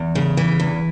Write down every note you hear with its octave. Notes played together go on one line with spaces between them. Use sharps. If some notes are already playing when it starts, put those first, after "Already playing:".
Already playing: E2
C#3
E3
E2